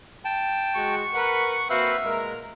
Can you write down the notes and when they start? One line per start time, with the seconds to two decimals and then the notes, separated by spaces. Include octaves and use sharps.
0.25 G5 A5
0.75 G#3 F#4 C#6
1.14 A#4 B4 F#5
1.70 A#3 C4 F#4 B4 E5 F5 F#6
2.04 A#2 G#3 A#4